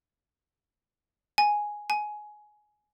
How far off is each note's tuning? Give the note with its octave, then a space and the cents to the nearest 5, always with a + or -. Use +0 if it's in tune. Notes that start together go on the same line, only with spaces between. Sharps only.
G#5 +0
G#5 +15